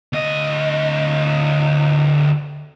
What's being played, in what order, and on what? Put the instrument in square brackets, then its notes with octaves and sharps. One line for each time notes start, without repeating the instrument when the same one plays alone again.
[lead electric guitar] D2 D#5